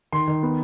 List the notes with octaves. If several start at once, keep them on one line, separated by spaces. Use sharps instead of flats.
D#3 C6
D#3
B3